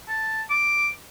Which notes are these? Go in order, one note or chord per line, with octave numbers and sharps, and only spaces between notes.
A5
D6